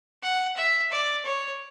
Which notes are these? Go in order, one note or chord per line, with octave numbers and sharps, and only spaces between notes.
F#5
E5
D5
C#5